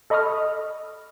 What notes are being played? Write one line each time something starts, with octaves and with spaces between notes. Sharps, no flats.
A4 D#5 B5 C#6 D#6 F6